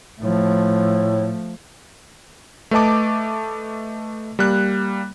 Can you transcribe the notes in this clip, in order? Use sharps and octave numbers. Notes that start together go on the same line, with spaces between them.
A2 F3 A3
A3 B4 D#5 A5 D6
G3 A#3 F#6